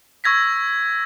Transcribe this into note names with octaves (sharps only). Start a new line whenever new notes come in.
C#6 E6 G#6 A#6 B6